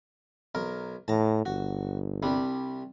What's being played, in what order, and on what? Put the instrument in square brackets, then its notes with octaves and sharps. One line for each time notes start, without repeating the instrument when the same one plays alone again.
[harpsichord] B1 A#4
[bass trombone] A2 [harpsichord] A5 A#5
[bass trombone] G1 [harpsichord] F#4
[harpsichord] C2 G3 D4